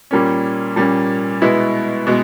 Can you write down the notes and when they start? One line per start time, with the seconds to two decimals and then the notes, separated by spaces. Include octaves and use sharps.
0.11 A#2 G3 A#3 C#4
0.76 A#2 G3 A#3 C#4
1.42 B2 G#3 B3 E4
2.07 B2 G#3 B3